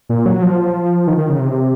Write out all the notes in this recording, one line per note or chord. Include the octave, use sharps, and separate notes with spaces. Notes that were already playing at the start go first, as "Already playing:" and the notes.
A#2
F#3
F3
D#3
D#3
C#3
C3